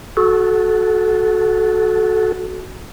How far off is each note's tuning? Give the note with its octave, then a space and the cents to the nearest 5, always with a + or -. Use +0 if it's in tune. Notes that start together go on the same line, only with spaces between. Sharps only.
F#4 +0 A4 -20